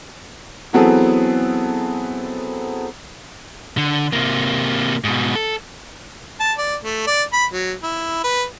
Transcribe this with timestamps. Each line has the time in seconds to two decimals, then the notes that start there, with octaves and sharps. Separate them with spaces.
0.73 E3 F#3 B3 C4 G#4 A4
3.78 D3
4.13 C3 A#3
5.04 G#2 B2
5.35 A4
6.40 A5
6.58 D5
6.84 A3
7.07 D5
7.33 B5
7.53 F#3
7.83 E4
8.24 B4